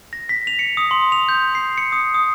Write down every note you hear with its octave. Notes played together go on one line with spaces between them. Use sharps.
A#6
B6
F7
C#7
D#6
C6
F7
G6
C7
C#7
D#6
D#6